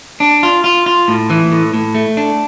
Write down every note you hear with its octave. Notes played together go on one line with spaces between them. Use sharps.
D4
F4
F4
F4
A2
E3
A2
A2
A3
D4